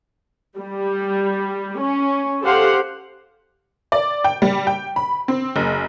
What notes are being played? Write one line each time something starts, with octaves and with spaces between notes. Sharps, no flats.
G3
C#4
G4 A4 C5 F5 F#5
D5
G5
G3
G5
B5
C4
F#1